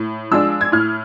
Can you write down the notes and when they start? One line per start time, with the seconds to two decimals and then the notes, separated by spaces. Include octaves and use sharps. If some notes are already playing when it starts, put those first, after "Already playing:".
Already playing: A2
0.31 F3 G#3 D4 E6
0.61 G#6
0.72 A2 F6